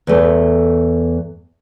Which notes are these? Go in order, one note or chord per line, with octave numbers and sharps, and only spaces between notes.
E2 A3